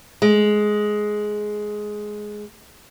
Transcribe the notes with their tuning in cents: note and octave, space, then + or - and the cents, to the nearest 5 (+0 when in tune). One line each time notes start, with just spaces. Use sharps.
G#3 +10